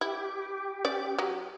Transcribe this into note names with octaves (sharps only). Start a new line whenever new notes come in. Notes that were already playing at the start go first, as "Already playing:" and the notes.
E4 G4
C#4 D5
F#3